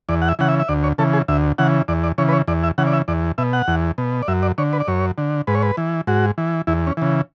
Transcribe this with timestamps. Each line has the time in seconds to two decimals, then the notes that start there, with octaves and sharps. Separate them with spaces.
0.09 E2 D5
0.22 F#5
0.29 E5
0.39 C#3 E3 F#5
0.49 E5
0.59 E5
0.68 D2 D5
0.83 C#5
0.98 C#3 E3 A4
1.13 G#4
1.28 D2 E5
1.58 C#3 E3 F#5
1.88 E2 D5
2.04 D5
2.18 C#3 E3 C#5
2.29 B4
2.33 C#5
2.48 E2 D5
2.63 E5
2.78 C#3 E3 F#5
2.87 D5
2.93 E5
3.08 E2 D5
3.38 B2 E5
3.53 F#5
3.68 E2
3.98 B2
4.22 D5
4.28 F#2 E5
4.43 D5
4.58 D3 C#5
4.73 B4
4.80 D5
4.88 F#2 C#5
5.18 D3
5.47 G#2 B4
5.55 C#5
5.63 B4
5.77 E3
6.07 G#2 F#4
6.38 E3
6.67 E2 E4
6.87 C#4
6.97 C#3 E3